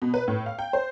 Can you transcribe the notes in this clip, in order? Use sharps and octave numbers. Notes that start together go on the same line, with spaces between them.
B2
B4
A2
F5
G5
C5